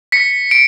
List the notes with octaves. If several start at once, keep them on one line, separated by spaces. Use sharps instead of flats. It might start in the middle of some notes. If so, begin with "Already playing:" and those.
B6 C#7
D7